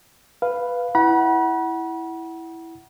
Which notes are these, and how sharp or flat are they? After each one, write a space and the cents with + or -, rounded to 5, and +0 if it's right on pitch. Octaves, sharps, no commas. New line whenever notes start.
B4 +0 F5 +0
E4 +0 F#5 +20 B5 -35